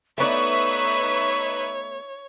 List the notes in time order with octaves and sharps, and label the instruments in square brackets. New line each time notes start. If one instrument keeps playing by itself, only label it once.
[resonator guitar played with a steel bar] A3 B3 D5 [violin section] D#4 B4 E5 [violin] C#5 [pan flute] C#6